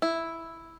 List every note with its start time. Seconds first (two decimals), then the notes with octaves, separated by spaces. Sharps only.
0.02 E4